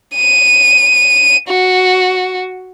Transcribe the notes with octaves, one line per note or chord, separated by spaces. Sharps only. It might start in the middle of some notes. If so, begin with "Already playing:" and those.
D#7
F#4